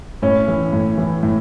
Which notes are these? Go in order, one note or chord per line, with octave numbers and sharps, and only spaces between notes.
A2 C#4
E3
A2
E3
A2